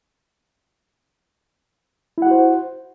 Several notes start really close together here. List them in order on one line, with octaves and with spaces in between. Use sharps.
E4 F#5 F#4 C5